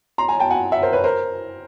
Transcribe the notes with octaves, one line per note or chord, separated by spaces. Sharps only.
A#5 C6
G#5 A#5
G5 A5
F#5 G#5
E5 F#5
A#4 C5
B4 C#5
A#4 C5